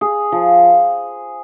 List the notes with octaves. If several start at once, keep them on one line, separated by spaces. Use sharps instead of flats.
G#4
F3